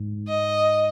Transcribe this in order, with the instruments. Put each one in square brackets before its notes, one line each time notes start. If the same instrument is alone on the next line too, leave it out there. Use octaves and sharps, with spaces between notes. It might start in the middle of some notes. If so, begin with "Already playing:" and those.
Already playing: [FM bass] G#2
[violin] D#5